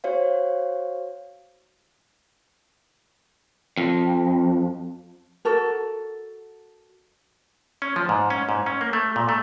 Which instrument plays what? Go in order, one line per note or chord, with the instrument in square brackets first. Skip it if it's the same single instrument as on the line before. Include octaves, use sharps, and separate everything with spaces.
[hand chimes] F#4 C5 C#5 F5
[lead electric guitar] F2
[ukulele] F#4 A4 A#4
[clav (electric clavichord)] C#4
F3
G#2
C#4
G#2
C#4
A#3
A3
A#2
A3